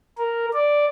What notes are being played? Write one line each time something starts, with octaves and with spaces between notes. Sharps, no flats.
A#4
D5